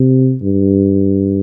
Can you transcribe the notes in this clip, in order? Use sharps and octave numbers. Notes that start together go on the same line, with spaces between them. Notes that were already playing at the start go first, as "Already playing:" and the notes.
Already playing: C3
G2